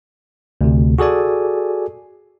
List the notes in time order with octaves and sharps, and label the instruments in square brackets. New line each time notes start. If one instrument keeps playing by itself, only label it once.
[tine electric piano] D2 C3
F#4 G#4 A4 D5 G#5